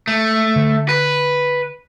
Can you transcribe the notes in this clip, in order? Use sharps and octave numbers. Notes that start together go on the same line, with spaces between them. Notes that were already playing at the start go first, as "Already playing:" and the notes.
A3
D3
B4